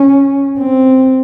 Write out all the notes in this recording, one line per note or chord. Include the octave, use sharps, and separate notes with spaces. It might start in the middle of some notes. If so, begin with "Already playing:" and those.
Already playing: C#4
C4